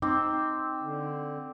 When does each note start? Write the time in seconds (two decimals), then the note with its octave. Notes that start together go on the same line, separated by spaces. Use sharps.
0.02 C4 D#4 D6
0.82 D3